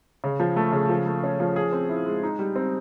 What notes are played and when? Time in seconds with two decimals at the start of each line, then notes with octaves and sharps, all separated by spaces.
0.24 C#3
0.40 F3
0.56 A3
0.73 C#3
0.89 F3
1.06 A3
1.24 C#4
1.40 F3
1.56 G#4
1.72 C4
1.89 E4
2.06 G#3
2.23 D#4
2.39 G3
2.56 C4